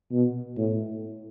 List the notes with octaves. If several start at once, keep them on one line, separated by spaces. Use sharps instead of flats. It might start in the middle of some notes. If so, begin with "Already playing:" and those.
B2
A2